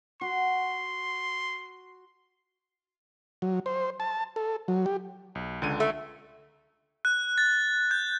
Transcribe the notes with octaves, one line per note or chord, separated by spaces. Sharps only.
F#4 C6
F#3
C5
A5
A4
F#3
G4
B1
C#2 D3 D#7
A3
F#6
A6
G6